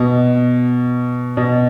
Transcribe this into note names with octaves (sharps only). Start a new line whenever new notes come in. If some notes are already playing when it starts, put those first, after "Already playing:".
Already playing: B2
B2